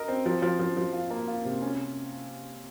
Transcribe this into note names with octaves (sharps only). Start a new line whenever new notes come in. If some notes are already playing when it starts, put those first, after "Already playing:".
Already playing: A#4 D#5
C4
F3
F3
F3
F3
F4
A#3
F4
C3
C#4